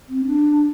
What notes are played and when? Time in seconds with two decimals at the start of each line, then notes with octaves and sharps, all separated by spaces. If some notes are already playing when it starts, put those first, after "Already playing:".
0.08 C4
0.26 D4